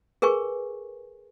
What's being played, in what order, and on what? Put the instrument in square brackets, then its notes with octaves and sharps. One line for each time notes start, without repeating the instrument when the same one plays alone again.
[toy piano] G#4 A#4 B4 G#5 C#6